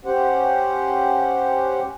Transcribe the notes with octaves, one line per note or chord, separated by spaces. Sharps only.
C#4 G4 C5 F#5